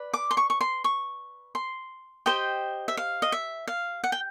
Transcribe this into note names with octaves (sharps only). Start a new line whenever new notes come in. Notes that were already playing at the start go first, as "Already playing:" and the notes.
Already playing: B4 D5
D6
C6
C#6
C#6
C6
C#6
C6
G4 C5 D#5 G5
E5
F5
D#5
E5
F5
F#5
G5